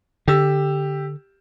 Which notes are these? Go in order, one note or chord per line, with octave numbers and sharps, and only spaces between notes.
D3 G4 E6